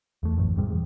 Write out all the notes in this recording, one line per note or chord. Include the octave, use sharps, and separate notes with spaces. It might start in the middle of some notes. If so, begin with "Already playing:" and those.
E2 A3
A1 F#2
G#2 C3 G3 G#3
E2